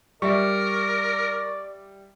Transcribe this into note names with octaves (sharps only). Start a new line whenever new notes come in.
G3 A#4 D5 E5 C#6